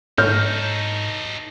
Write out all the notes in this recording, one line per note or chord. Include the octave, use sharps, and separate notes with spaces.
G#2 D#4 A4 C#5 F6 G6